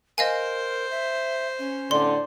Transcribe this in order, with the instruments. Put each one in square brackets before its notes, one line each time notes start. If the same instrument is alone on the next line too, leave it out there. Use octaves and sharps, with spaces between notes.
[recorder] A#4 [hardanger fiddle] C5 [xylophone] D#5 F5 G#5
[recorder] E5
C#4
[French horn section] A2 D3 D5 [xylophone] C6